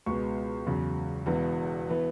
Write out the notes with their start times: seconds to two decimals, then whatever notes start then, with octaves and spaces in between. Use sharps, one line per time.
0.06 C#2 B2 G#3 B3 C#6
0.66 E2 C#3 F#3
1.26 E1 E2 E3 B3
1.89 E3 B3